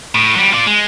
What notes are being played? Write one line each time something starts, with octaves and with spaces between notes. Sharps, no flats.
A2
F#3 G3
F4 D5
G#3